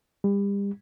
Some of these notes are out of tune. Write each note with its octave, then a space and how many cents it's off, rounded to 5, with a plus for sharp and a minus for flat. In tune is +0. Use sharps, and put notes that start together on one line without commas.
G3 +35